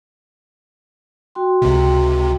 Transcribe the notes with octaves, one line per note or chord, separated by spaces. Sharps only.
F#4 G5 C6
C#2 C3